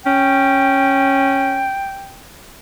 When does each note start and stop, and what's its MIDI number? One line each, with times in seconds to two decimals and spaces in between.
0.06 1.70 61
0.06 2.19 79